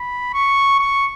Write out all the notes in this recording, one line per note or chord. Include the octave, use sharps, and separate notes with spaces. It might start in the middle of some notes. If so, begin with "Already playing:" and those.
Already playing: B5
C#6
C#6